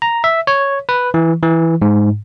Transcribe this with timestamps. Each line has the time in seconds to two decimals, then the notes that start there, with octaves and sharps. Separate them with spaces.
0.02 A#5
0.24 E5
0.47 C#5
0.89 B4
1.14 E3
1.43 E3
1.82 G#2